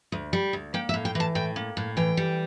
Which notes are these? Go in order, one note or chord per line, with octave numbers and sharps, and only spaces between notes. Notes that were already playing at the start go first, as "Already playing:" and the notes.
D2
G3
D2
A#3 G5
E5
A2
G5
E3 A5
A2 G5
A#3
A2
E3 G5
G3